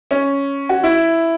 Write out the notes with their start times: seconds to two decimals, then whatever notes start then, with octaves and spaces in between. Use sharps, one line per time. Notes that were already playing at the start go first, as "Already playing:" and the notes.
0.11 C#4
0.69 F#4
0.83 E4